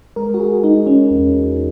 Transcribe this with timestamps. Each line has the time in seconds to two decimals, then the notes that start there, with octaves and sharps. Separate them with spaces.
0.16 G#3 A#4
0.34 F#4
0.40 G#4
0.63 G#3 D#4
0.87 C#4
1.11 E2